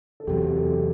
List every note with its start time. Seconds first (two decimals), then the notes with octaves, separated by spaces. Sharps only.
0.20 A4
0.27 E2 C3 F#3 G4
0.56 A4